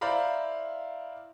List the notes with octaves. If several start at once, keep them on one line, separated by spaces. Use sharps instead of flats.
E4 C5 D5 F5 A#5 B5